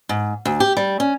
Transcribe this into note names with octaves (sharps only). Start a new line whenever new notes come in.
G#2
D2
G4
G3
C#4